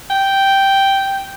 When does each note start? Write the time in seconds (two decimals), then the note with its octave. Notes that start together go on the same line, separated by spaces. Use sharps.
0.10 G5